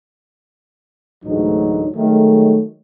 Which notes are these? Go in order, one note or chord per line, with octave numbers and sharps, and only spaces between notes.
A1 D2 G#2 F#3 D4 D#4
D#3 F#3 G#3 A3